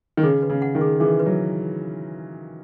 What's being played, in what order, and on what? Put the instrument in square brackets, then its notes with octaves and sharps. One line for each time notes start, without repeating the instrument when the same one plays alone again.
[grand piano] D#3
[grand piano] C#3 [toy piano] G#4
[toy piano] B4
[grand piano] C#3
[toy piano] F#5
[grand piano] D#3
[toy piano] G#4
[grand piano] E3 [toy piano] G#4
[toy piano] B4
[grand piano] F#3